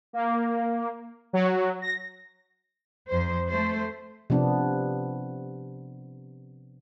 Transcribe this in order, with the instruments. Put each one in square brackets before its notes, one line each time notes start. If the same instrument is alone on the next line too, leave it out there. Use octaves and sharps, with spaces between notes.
[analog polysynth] A#3
F#3
A#6
[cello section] F2 C5
A3 C5
[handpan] C3 F3 B3 D4